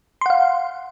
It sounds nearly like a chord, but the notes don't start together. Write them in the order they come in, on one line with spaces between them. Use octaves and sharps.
C6 F#5 F5